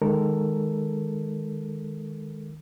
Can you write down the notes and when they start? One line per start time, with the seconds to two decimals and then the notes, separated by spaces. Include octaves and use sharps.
0.02 D#3 G#3 A4 A#4